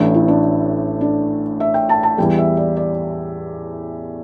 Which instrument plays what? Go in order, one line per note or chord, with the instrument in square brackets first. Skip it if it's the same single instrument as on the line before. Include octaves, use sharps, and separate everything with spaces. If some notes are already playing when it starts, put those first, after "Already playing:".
Already playing: [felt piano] A1 A2 E3 D4
E4
D4
D4
E5
G5
A5
A5
E2 E3 G3 G5
E5
D5
D5